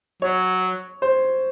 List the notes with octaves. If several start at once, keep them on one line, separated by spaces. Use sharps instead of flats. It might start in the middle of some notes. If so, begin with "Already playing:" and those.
F#3 C#5
C5